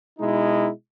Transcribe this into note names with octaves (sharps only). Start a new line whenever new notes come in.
B2 G#3 D#4 E4